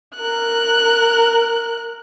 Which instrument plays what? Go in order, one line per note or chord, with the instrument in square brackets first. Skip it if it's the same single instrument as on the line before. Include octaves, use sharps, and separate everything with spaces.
[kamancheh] A#4 F#6